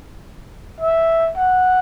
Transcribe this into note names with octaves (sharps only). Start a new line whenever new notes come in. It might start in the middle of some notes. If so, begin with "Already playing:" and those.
E5
F#5